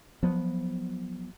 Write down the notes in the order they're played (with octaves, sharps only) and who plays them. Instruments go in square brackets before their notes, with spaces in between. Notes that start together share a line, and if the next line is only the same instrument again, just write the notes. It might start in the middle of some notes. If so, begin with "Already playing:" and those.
[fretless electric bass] F3 F#3 B3